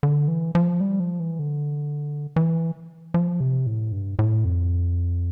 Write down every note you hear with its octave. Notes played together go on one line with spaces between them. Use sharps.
D3
E3
F3
G3
F3
E3
D3
E3
F3
C3
A2
G2
A2
F2